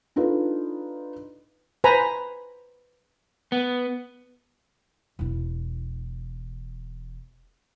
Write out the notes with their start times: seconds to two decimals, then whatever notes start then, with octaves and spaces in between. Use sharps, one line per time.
0.16 D4 D#4 F4 A4 B4
1.84 B4 C5 G#5 A#5 B5
3.52 B3
5.19 E1 E4